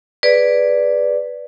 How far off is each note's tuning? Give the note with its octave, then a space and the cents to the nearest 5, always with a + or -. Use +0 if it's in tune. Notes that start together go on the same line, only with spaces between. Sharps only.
G#4 +0 B4 +0 D5 +0